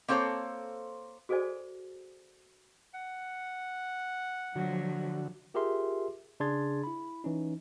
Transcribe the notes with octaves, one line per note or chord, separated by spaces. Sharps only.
A#3 C4 A4 C5 C#5
F#4 G#4 A4 C5 D5 G#5
F#5
D3 F3 F#3 F#4
F4 G4 G#4 A#4 E5 C6
C#3 D4 G#4 C6 G#6 A6
E4 B5
E3 C#4 D#4